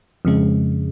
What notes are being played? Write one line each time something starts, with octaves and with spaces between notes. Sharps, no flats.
F2 C#3 G#3